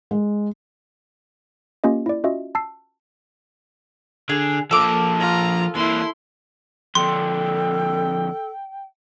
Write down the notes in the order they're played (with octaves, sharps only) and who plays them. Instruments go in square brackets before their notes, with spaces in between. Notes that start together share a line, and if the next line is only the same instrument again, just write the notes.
[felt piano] G#3
[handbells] A#3 C#4 F4 G4 D#5
E4 D5
C#4 F4 F#4 D#5 E5
A5 E6 C7
[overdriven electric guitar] D3 [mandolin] G#4
[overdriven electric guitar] F3 A#3 [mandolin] A4 D6
[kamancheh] F4 A#5
[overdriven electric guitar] E3 A#3 [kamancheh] E4 C6
[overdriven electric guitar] F2 D3 [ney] A4 [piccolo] G5 [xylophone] C6